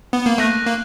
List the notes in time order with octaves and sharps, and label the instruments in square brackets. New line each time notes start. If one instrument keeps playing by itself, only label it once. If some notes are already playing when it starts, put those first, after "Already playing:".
[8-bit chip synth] B3
A#3
[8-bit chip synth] A3 [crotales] F#6 A#6 D#7
[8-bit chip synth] A#3